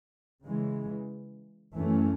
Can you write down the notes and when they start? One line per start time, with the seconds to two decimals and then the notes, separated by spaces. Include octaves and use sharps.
0.43 C#3 E3 G#3
1.76 F#2 E3 A3 C#4